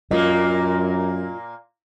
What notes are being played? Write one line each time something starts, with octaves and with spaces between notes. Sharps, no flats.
F#2 A#2 A#3 F4 D#5